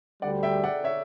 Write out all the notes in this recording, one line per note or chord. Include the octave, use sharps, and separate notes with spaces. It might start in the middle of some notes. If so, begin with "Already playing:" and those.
D2 D3 G3 D5 F#5
E5 G5
D5 F#5
C#5 E5